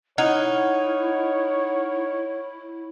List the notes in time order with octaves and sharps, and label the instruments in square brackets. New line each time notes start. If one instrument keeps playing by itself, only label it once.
[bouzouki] D#4 [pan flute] E4 [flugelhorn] C#5 [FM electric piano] F#5 F6 G#6